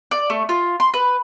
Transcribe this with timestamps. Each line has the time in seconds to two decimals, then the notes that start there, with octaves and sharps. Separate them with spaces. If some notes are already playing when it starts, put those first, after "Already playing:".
0.11 D5
0.30 A3
0.49 F4
0.80 C6
0.94 B4